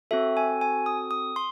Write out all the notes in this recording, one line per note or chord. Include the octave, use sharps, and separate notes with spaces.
C4 F#4 A4 E5
G#5
G#5
D#6
D#6
C6